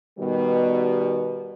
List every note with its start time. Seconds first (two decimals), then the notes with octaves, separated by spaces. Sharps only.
0.19 B2 D#3 G3